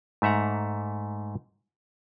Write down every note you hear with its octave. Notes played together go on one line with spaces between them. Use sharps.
G#2 A3 E5 F#5 A#5